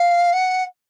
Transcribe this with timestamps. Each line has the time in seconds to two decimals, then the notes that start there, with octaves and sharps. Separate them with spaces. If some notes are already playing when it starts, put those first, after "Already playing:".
Already playing: F5
0.33 F#5